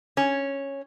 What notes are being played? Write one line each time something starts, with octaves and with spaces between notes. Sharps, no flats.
C#4